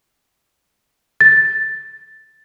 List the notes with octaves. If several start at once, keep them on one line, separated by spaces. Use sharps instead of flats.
A6